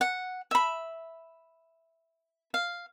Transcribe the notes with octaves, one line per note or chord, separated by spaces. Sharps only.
F#5
E5 B5
F5